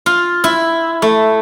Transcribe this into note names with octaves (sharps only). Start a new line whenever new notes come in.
F4
E4
A3